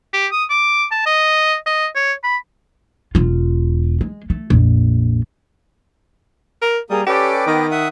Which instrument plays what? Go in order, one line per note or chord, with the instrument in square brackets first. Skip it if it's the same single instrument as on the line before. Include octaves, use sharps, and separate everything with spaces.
[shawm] G4
D#6
D6
A5
D#5
D#5
C#5
B5
[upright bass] E1 F4
G#3
A3
A#1 F2
[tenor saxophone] A#4
[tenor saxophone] G3 [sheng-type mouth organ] A#3 D#6 [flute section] G#4 A#5
[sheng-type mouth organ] C#4 A4 D5 [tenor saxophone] G4 [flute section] B4 G5 D6
[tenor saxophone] D#3 [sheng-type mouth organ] B3 D#5
[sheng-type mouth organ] E5 F#5 D#6